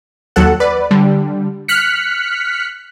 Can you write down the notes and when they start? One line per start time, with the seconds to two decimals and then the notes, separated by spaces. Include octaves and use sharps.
0.36 D#2 F#3 A4 F#5
0.60 B4 D5
0.91 D3 G3
1.68 F6 F#6 B6 C#7